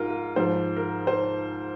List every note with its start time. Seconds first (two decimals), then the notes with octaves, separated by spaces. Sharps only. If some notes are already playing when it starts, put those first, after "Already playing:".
Already playing: G#2 F4 A#4
0.10 A#4
0.36 G#2 F3 C5
0.77 A#4
1.07 C5